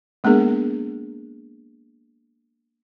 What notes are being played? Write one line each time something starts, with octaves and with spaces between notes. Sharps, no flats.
G#3 A#3 B3 D4 G#4 A#4